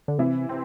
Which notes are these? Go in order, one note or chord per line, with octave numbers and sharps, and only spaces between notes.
D3
C3 E3 E4
C3 C4